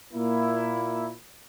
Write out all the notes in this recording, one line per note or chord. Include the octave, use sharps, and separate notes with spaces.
A#2 A#3 E4